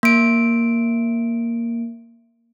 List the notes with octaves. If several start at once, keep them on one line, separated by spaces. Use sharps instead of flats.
A#3 D7